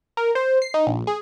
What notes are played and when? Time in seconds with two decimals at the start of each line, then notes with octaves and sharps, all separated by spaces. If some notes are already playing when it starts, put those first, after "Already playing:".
0.17 A#4
0.35 C5
0.62 C7
0.74 D#4
0.87 A#1
1.07 G#4